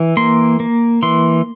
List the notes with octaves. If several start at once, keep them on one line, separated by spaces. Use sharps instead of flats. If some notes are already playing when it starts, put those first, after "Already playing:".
Already playing: E3
A#3 C6
A#3
E3 C6